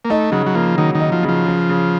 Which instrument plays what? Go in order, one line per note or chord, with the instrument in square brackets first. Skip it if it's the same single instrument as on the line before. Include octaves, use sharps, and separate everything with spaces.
[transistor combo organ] A#3
[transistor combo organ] A3 [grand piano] D#4
[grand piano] C#3 [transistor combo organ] F#3
[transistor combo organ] F#3
[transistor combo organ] F3 [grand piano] A#3
[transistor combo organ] D#3 [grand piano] F#3
[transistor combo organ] D#3
[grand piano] D#4
[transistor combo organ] F3
[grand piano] C#3
[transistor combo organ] F3
[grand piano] C#3
C#3